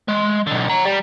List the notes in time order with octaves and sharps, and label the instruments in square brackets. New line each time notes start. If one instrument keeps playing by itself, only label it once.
[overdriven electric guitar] G#3
B1 D3
F#5 A#5
G3